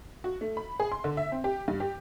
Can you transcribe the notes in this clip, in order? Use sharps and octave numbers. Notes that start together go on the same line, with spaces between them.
F#4
A3
B5
G#4
C6
D3
E5
C4
G4
G2
G4